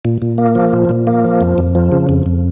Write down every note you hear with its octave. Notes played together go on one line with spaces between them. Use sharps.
A#2
A#2
A#3
F3
A#2
A#2
A#3
F3
F2
F2
F3
C#3
F2
F2